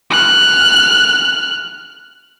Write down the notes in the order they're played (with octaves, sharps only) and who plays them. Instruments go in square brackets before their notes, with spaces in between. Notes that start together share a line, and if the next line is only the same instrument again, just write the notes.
[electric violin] F6 F#6